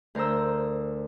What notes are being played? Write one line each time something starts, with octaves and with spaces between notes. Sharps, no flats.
D2 A#4 C5 A#5 E6